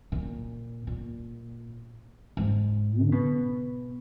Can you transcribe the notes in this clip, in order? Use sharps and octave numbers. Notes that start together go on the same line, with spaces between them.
A#2
A#2
G#2
D3
B2